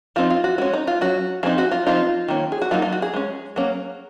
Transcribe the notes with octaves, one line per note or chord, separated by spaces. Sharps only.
F3 C4 D#4 F4
F4
F#4
G#3 C#4 F#4
D#4
F4
F#3 C#4 F#4
F3 C4 D#4 G#4
F#4
F4
F3 C4 D#4 F4
D#3 A#3 C#4
G#4
F#4
F#3 A#3 D#4 F4
F4
F#4
G#4
G#3 C#4
F#3 A#3 C#4